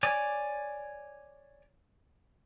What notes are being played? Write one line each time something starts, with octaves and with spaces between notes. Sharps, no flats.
C#5 D5 G#5 D6